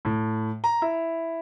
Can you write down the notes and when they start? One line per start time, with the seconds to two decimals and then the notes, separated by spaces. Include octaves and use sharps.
0.05 A2
0.64 A#5
0.82 E4